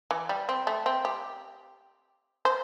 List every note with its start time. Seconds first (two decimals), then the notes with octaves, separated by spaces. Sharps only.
0.11 E3
0.29 G3
0.49 C4
0.67 A3
0.86 C4
1.05 G4
2.45 C5